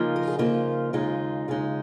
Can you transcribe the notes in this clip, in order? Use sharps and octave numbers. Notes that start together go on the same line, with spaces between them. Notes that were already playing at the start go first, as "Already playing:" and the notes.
Already playing: C#3 F3 A#3 D#4 F4
A#4
G#4
C#3 F3 A#3 D#4 F4
D#2 C#3 G#3 D#4 F4
D#2 C#3 G#3 D#4